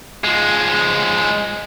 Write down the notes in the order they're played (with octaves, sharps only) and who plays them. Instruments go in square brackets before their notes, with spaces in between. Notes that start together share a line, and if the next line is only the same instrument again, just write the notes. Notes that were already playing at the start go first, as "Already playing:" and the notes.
[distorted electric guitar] F3 G#3